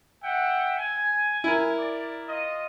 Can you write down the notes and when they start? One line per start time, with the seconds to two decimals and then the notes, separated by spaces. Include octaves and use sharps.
0.22 E5 F#5 G5
0.78 G#5
1.44 E4 A#4
1.78 D5
2.28 F4 D#5